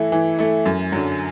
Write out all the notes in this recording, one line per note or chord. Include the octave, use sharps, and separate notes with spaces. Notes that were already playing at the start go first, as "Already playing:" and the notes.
Already playing: E3 A3 E4
E3
A3 E4
F#2
D3 F#3